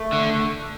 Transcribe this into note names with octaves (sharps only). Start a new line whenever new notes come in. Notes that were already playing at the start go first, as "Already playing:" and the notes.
Already playing: A3
D3